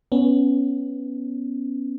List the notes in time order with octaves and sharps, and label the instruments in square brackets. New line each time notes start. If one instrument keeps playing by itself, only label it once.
[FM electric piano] B3 C#4